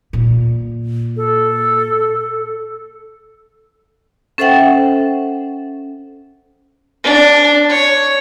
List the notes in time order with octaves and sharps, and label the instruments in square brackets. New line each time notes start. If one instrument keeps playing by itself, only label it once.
[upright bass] A#2
[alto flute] A4
[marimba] C#4 A4 C5 E5 F#5 G5
[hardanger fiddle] D4
C#5